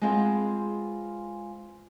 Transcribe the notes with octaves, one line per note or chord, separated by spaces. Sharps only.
G#3 B3 C4 F4 G#4